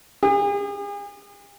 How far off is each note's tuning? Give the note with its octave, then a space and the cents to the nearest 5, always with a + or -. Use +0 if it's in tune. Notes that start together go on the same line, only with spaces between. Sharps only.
G#4 -40